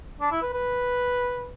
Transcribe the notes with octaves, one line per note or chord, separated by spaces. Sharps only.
D4
E4
B4
B4